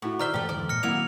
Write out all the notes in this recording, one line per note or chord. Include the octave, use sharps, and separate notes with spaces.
A2 E4 F#4 C#6
D#3 C5 D5 E5 A#5 F6 G7
G2 C3 E3 A3 G4
E2 G#2 D3 E3 D5
A#2 F6 A#6 C#7
D#3 F#3 A#3 C4 E4 D5 F7